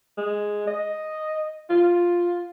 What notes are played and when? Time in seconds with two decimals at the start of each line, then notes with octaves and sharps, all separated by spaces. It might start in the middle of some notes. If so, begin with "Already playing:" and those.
0.18 G#3
0.67 D#5
1.70 F4